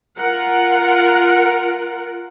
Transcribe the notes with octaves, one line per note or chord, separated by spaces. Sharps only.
F4 A#4 F#5